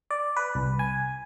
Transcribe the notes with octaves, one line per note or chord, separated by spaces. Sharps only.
D5
B4
C2
G#5